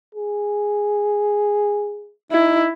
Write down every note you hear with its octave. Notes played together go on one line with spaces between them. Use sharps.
G#4
D#4 E4